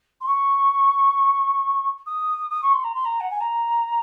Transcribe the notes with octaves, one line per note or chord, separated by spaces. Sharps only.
C6
C#6
D#6
D#6
C#6
C6
A#5
C6
A#5
F#5
G#5
A#5